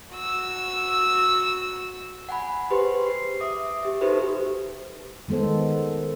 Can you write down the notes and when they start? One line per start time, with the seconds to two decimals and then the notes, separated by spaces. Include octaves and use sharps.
0.13 F#4 E6
2.29 F#5 G#5 B5
2.71 G4 G#4 B4 C5 C6
3.06 C7
3.40 E5 D6 D#6
3.83 G4 E5
4.01 D#4 F#4 G4 A4 B4 C5
5.28 D#3 G#3 B3 A4 C5